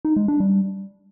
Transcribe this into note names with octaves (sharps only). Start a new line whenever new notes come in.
D#4
G#3
D4
G3